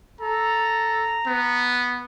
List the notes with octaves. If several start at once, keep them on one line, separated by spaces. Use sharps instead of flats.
A4 A#5
B3